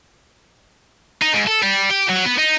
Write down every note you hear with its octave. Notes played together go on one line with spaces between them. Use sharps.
D#4
G#2
A4
G3
G4
F#3
B3
D#4